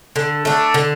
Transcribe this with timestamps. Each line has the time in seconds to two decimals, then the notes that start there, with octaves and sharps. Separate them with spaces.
0.16 D3
0.45 A3 D4
0.74 D3